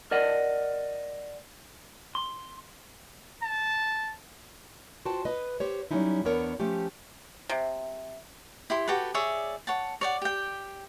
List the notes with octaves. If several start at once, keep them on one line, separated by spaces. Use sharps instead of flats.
A#4 D5 D#5 F#5
C6
A5
F4 F#4 C5 G5 A5
B4 D#5
G4 C5 C#5
F#3 G3 A3 C#4 D#4 E4
E2 B3 D4 A#4 C#5 F#5
F3 A3 C#4 G4
C3
E4 G4 C6
F#4 G4 A4 B4
G#4 C#5 D5 E5
C#5 F#5 A5
C#5 D5 F#5
G4 G5